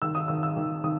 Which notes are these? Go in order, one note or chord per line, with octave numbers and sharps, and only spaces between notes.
D#3 E6
D#6
D#3 E6
E6
D#3
D#3 D#6